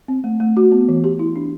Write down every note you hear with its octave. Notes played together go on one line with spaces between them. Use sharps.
C4
A3
A3
F#4
B3
E3
G4
E4
D4